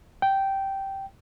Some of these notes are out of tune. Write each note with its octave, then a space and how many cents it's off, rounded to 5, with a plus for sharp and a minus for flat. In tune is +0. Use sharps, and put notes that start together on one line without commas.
G5 -10